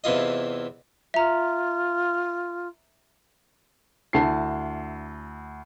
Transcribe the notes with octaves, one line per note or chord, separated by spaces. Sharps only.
E2 C3 E3 F4 D#5
F4 E5 A#5
D2 E4 A5 C7